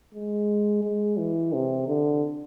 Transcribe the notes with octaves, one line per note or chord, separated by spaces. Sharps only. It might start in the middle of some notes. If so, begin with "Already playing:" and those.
G#3
G#3
E3
C3
D3